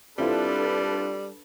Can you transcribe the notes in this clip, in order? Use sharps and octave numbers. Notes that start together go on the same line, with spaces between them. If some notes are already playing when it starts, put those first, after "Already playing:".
G3 C4 D4 E4 F4 A4 B4